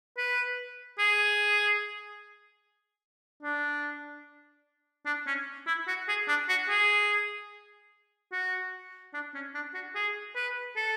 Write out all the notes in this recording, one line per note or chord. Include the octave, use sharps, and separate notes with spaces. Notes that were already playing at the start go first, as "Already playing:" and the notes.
B4
G#4
D4
D4
C#4
E4
F#4
G#4
D4
F#4
G#4
F#4
D4
C#4
D4
F#4
G#4
B4
A4